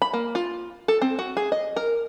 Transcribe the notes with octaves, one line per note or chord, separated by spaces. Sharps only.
B5
A#3
F4
A4
C4
F#4
G#4
D#5
A#4